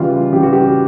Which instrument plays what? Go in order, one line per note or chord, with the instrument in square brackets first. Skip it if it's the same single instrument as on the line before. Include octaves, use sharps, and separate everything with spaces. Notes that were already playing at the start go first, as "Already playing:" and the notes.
Already playing: [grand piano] C#3 E3 G3 F4
C#3 E3 G3 G4
F#4
G4